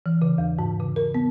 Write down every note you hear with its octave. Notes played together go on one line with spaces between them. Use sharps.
E3
C#3
E2
G#2
C#3
A#4
B3